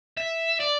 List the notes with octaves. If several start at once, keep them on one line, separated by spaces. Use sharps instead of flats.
E5
D5